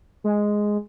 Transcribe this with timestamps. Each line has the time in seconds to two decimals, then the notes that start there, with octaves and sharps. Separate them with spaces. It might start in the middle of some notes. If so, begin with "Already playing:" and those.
0.24 G#3